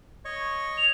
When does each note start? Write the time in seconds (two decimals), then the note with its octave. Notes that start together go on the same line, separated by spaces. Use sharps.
0.25 C#5 D#5 C#6
0.78 F7